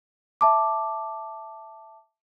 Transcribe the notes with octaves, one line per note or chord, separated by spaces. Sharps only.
E5 A5 D6